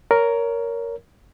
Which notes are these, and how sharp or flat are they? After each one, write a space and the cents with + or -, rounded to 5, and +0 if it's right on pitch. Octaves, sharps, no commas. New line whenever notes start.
A#4 +0 C#5 +20